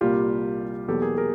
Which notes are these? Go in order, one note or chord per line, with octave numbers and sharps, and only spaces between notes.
C2 A#2 G3 A#3 F4 G4
E2 B2 F#3 A#3 G4 A4
G#4 A#4
G#4 A#4